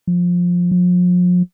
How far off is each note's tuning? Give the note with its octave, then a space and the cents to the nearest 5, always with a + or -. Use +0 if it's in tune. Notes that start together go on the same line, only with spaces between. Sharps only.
F3 +15
F3 +40